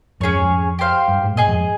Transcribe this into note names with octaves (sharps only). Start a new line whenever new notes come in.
F2 G#2 C#4 G#4 C#5
F2 G#2
F2
G4 C5 F5
G2
G#2
A#2 G#4 D#5 G#5
F2 G#2